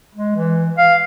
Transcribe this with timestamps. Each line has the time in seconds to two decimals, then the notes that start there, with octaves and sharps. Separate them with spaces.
0.15 G#3
0.36 E3
0.77 F5